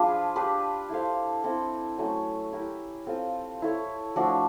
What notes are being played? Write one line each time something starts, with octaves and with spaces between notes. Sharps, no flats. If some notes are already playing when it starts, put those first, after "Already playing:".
Already playing: F3 D4 F4 G#4 B4
D4 G4 B4 D5
E4 A4 C5 F5
C4 E4 A4
F#3 A3 C#4
E4 G4 A#4
C4 F4 A4
E4 A4 C#5
F3 A3 D4 F#4